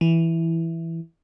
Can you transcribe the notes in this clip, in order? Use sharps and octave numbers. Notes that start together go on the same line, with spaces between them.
E3